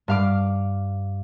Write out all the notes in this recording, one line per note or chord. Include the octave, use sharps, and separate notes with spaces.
G2 F5 D6